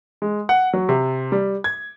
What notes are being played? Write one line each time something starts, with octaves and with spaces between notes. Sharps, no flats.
G#3
F#5
F#3
C3
G3
G#6